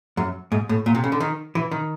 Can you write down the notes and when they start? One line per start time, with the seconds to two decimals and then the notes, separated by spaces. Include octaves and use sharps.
0.17 F#2
0.52 G#2
0.69 A2
0.86 A#2
0.95 C3
1.04 C#3
1.12 D3
1.20 D#3
1.55 E3
1.72 D#3